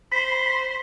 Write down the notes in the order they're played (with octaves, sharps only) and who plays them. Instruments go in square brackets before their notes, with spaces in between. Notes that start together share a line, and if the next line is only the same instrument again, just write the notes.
[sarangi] C5 [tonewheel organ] B5